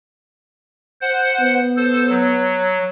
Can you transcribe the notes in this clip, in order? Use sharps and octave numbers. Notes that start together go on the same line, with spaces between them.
C5 F#5
B3
A4 C5
F#3